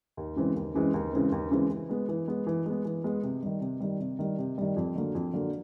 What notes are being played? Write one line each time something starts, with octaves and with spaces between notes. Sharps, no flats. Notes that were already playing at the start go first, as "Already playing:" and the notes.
D#2
C#3 E3 G#3 C4
D#2
C#3 E3 G#3 C4
D#2
C#3 E3 G#3 C4
D#2
C#3 E3 G#3 C4
E3
G#3 B3
E3
G#3 B3
E3
G#3 B3
E3
G#3 B3
C3
D#3 G3
C3
D#3 G3
C3
D#3 G3
C3
D#3 G3
F2
D3 F#3 A#3
F2
D3 F#3 A#3